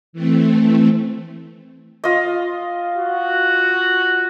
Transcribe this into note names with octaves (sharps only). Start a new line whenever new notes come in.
E3 A3 C4
F4 D#5
F#4